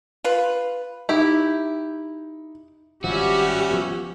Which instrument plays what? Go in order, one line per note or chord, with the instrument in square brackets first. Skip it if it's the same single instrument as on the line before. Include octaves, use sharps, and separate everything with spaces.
[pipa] F4 B4
[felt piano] D#4 [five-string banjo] E4 G4
[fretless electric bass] G#1 F3 [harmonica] G3 C#4 E5 [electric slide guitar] F#4 [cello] G4
[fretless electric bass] F3 B3